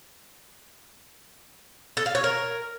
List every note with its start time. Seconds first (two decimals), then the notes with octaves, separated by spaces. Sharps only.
1.97 A4
2.06 F5
2.15 C#5
2.24 A#4